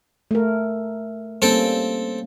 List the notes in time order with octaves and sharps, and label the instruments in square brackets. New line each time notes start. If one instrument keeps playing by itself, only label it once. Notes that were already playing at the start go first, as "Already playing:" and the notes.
[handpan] A3 A#4
[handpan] G3 A#3 C#4 [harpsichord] C4 A4 G5